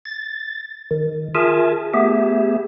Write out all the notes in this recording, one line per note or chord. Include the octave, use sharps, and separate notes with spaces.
A6
D#3
F4 G#4 A#4 E5 G#5 A5
A3 B3 G4 G#4 E5